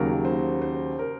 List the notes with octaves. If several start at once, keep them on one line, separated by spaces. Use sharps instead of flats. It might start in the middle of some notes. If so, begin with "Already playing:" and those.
Already playing: D#2 C#3 F#3 A#4
C5
C5
A#4